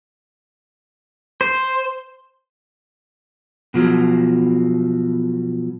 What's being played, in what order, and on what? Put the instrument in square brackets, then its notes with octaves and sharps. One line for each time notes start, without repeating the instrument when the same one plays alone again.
[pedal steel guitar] C5
[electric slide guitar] B2 F3 F#3